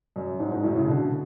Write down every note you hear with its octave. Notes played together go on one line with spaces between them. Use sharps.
F#2
G#2
G#2
F#2 A2
A2 C#3
B2 D3